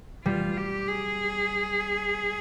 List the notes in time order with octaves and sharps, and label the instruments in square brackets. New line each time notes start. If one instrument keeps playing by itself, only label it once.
[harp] G3 [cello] F4
[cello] G4
G#4